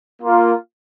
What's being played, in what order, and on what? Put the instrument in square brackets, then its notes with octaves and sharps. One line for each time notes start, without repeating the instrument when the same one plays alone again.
[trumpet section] A#3 F4